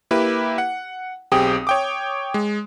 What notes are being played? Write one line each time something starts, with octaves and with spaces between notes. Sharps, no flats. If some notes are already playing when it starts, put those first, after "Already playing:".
A#3 E4 G4 B4
F#5
B1 C4 G4 G#4 G5 D#6
C#5 G5 D6
G#3